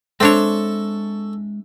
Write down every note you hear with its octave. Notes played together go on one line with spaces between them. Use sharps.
G#3 C4 D4 A4 C#5 E5 C#6